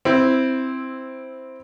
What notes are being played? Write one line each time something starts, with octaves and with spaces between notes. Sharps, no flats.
C4 E4